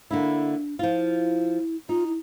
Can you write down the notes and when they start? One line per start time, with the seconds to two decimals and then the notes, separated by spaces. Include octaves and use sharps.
0.11 D3 A#3 D4 E4
0.79 F3 E4 F4
1.89 D#4 F4
2.06 E4